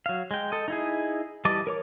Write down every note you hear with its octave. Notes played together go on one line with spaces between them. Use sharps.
F#3 F5
G#3 G5
A4 D#5
D#4 E4 G#4
E3 G3 D#5 A5 D6
A#4 C#5 D6